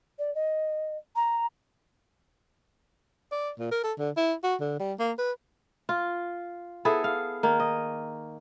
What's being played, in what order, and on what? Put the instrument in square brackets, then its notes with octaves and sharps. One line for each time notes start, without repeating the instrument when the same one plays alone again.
[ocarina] D5
D#5
A#5
[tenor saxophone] D5
A#2
A#4
A4
D3
E4
F#4
D3
G3
A#3
B4
[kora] F4
B3 E4 G#4 A4
F5
D#3 A#3
D#5